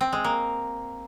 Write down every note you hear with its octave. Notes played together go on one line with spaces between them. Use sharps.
C4
G#3
A#3